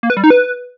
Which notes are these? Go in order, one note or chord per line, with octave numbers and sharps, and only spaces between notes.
A#3
B4
G3
D#4
B4